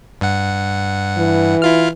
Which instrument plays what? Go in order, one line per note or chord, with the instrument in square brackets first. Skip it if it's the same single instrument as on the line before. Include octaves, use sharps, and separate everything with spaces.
[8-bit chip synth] G2 F#5
[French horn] E3
[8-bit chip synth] E4 F4 F6